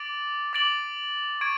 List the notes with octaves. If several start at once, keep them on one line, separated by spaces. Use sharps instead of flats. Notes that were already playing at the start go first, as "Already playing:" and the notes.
Already playing: D6 A6 D7 F#7
D6 A6 D7 F#7
C#6 G#6 D7